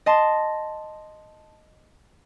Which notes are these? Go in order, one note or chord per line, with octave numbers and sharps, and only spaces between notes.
D#5 A5 C6